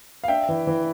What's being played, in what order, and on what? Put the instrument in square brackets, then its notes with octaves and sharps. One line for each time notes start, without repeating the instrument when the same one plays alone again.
[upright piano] F5
[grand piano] D4 [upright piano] E5 G5
[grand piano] E3
E3